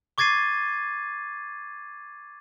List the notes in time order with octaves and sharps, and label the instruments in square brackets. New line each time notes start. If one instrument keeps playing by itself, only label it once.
[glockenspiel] C#6 D6 G#6 A6 C7 D#7